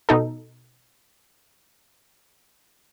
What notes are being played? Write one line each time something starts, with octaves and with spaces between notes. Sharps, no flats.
B2 D#4 A4